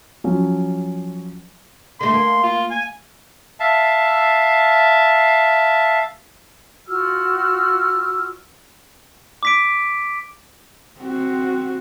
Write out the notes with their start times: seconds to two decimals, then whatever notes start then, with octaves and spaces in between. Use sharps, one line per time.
0.24 F3 F#3 C#4
2.01 D3 A3 C6
2.14 A#3
2.43 F4
2.71 G#5
3.60 E5 F5 A5
6.87 F4 F#4 E6 F6
9.43 D6 B6 D7
11.00 C4 F#4